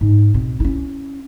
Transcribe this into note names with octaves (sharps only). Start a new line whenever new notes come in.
G#2
B2 C4
C#4 E4